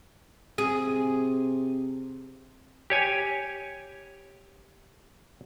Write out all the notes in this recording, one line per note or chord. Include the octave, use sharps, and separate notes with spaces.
C3 G#4
G4 C#5 G#5